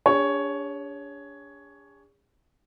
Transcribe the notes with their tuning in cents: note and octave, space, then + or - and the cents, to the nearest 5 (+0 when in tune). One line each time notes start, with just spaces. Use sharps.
D4 -35 G#4 -40 C#5 +5